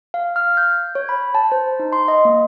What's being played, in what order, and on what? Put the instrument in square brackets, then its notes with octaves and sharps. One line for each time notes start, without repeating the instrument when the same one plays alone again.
[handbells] F5
F6
G6
C#5
B5
A5
C5
D#4
C6
D#5
A#3